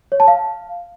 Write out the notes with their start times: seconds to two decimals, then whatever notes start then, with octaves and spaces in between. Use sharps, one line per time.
0.12 C#5
0.20 A5
0.28 F5